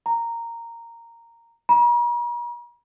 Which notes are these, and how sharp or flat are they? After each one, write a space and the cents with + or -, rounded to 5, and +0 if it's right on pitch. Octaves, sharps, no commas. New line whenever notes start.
A#5 -10
A#5 +45